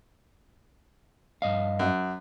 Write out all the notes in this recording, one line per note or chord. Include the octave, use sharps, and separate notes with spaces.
G2 D#5 F5
F#2